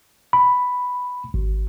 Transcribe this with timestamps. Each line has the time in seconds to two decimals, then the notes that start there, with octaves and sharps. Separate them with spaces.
0.33 B5
1.34 G#1